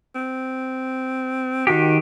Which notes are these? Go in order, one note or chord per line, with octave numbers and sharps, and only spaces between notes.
C4
D#3 F#4 G4